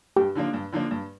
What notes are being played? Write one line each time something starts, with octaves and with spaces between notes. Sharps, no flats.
G2 G4
D3 F3 A#3 D4
G2
D3 F3 A#3 D4
G2